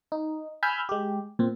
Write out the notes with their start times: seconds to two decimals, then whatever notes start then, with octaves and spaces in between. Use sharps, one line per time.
0.12 D#4
0.63 G#5 B5 E6 F6 G6 G#6
0.89 G#3 G4
1.39 A#2 C4